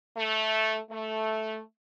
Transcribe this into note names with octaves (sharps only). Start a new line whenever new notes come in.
A3
A3